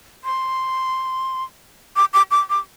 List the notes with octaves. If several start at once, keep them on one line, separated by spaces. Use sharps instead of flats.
C6
D6
D6
D6
D6